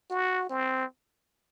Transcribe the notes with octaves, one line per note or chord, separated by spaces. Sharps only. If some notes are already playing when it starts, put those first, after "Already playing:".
F#4
C4